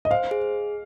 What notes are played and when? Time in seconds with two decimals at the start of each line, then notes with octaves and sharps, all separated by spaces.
0.05 D#5
0.11 C5 F5
0.31 G#4